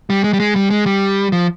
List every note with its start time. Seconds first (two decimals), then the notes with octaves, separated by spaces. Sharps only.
0.10 G3
0.24 G#3
0.33 G3
0.40 G#3
0.56 G3
0.70 G#3
0.86 G3
1.32 F3